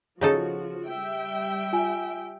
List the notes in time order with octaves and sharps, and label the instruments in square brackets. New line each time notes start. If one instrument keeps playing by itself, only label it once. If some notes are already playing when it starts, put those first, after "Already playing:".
[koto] C#3 D#4 A4 [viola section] F3 F#4
[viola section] G3 E5 G5
[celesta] F4 G#5